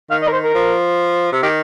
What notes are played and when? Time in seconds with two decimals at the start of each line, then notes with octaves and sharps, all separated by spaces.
0.10 D#3 F5
0.22 D#5
0.27 A#4
0.32 C5
0.44 A#4
0.55 F3
1.32 C3
1.42 D#3 G4